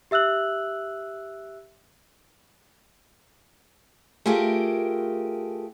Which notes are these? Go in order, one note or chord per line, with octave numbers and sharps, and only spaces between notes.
G4 E5 E6 F#6 F#7
A3 F4 G4 G#4 A#4